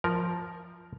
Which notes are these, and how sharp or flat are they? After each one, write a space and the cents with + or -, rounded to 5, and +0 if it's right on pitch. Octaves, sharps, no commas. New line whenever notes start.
F3 +0 A#4 +0